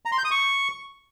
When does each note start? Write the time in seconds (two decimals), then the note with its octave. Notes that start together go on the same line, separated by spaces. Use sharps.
0.05 A#5
0.12 C6
0.18 G6
0.25 D#6
0.31 C#6